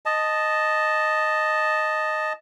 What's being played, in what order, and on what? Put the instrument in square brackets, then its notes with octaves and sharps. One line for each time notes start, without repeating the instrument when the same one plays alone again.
[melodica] D#5 A5